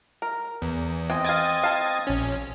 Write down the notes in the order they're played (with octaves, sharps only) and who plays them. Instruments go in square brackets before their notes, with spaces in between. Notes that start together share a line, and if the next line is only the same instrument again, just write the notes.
[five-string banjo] A#4
[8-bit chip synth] E2
[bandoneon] C4 D#5 [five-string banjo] G5 G#5
[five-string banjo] F5 G5 [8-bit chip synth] D#6 G#6 A6
[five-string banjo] A4 F5
[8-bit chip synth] A#1 C#4